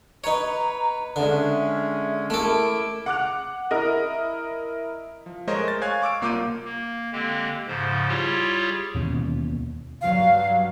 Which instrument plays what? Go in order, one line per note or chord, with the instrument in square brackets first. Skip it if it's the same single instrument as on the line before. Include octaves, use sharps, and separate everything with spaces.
[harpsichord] D#4 C#5 [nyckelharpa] B4 [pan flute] A#5
[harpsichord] D3 [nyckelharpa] G#3 C#4 [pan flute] E5
[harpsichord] A3 A4 [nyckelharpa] E4 D6 [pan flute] A#4
[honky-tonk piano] F#5 D6 F#6 F7
E4 A#4 D#5
[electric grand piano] F3
G#3 A3 A#4 C5 C#5 D#5
A6
C#5 F5 G#5 F#6 G#6
C#6 D6 E6 D7
C2 A#3 F4 D6 G6 D#7
[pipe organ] A#3
D3 G#3 A#3 C4 G4
G#2 C#3 F3 C5
G3 E4 F4 G4 G#4 C#5
[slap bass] D#2 B2 E3 C#4
[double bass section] G2 F#3 [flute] F5